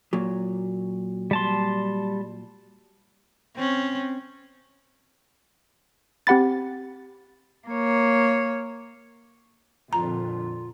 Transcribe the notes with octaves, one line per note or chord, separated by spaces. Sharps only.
A#2 F#3
G3 A5 C6
C4 C#4
C4 G4 F#5 B5 A6
A#3 C#5
F2 A#2 D3 F4 A#5